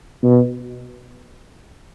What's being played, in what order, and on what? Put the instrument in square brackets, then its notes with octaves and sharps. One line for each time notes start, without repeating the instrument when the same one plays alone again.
[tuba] B2